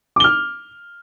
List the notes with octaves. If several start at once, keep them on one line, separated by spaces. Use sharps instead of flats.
D6 F6 G7